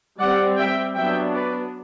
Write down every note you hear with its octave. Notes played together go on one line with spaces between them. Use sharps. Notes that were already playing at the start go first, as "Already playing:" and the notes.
G3 C4 D5 F#5
E5 G5
F#3 B3 D4 E5 G5
B4 D5